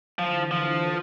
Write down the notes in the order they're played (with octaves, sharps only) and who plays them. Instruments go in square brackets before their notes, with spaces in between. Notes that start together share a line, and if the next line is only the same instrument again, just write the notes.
[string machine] D3 E3 [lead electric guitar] F3
[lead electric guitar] F3